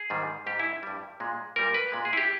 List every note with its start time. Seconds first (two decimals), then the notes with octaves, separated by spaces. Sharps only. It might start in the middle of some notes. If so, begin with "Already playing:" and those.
Already playing: G#4
0.10 G#2 D#3 G3
0.46 G#2 G3 G4
0.59 E4
0.83 G2 G3
1.20 A#2 G#3
1.56 A#2 G3 A#4
1.74 B4
1.92 A#2 G#3
2.05 G#4
2.13 E4
2.17 G4